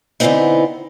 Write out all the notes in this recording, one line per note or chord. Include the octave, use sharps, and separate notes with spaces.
D3 E3 F3 B3 C4 D#4